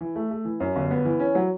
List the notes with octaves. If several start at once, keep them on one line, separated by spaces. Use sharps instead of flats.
E3
A3
A3
E3
F#2
G1
B3
E3
C#4
F#3